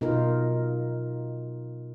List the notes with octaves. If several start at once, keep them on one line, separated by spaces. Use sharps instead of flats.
B2 D#4 F4 A#4